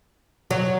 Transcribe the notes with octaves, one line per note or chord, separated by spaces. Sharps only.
F#3